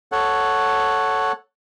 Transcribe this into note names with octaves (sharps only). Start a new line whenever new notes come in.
A4 C#5 F#5